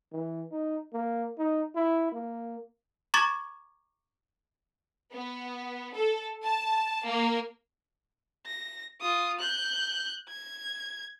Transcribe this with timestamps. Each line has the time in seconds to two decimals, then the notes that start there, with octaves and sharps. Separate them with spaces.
0.12 E3
0.51 D#4
0.93 A#3
1.38 D#4
1.75 E4
2.12 A#3
3.14 A#5 C#6 D6 G#6 A6
5.13 B3
5.95 A4
6.44 A5
7.06 A#3
8.46 A#6
9.01 F4 D#6
9.40 F#6 G6
10.29 G#6